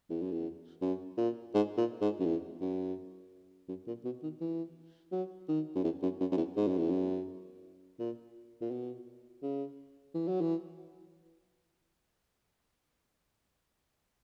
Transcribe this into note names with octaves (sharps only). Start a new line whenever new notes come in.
E2
F#2
E2
F#2
A#2
G#2
A#2
G#2
F#2
E2
F#2
F#2
A#2
B2
D#3
E3
F#3
D#3
F#2
E2
F#2
F#2
F#2
E2
G#2
F#2
E2
F#2
A#2
A#2
B2
C#3
E3
F#3
E3